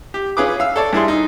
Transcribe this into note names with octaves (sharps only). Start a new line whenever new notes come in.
G4
C#4 F4 G#4 B4 D6
F5 E6
A4 C#5 D5
G2 E4 G#4 C6
D#4